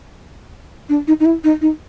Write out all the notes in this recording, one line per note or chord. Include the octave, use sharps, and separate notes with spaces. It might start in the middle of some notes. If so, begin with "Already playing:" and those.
D4
D#4
D#4
E4
D#4
D#4